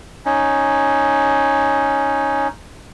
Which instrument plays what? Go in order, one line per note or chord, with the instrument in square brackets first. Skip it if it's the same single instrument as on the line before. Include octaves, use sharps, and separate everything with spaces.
[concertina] C#4 D#4